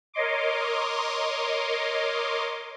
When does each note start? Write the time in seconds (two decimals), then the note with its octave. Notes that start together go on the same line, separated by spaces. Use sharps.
0.14 A#4 C#5 D#5 C6 D6